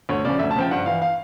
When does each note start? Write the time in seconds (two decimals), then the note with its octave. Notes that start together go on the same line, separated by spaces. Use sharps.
0.09 D2 C#5
0.24 C#3 F3 D5
0.39 D2 E5
0.51 A5
0.56 C#3 F3 G5
0.71 G2 F#5
0.86 E3 F5
1.02 F5